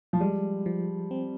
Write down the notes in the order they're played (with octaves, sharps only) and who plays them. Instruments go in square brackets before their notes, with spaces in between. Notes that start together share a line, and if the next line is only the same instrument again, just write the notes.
[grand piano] F3
[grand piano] G3 [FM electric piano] G#3
[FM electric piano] F3
C4